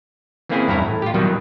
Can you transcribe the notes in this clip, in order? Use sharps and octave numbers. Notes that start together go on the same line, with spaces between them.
E3 A#3 C4 C#4 E4 G#4
E2 G2 E4 C#5 A#5
A2
F4 G4
B2 D#3 E3 F#3 G3